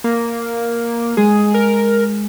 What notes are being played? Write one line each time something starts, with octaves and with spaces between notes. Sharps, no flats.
A#3
G#3 G#4
A#4